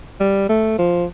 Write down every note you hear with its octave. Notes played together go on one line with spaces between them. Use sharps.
G3
A3
F3